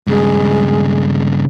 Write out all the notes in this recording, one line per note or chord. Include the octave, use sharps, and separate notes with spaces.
G2 C#3 G#3